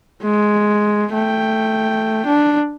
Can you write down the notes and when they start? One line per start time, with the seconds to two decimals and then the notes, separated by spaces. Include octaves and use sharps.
0.23 G#3
1.13 A3 G5
2.26 D4